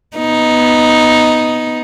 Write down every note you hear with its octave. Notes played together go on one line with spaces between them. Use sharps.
B3 D#4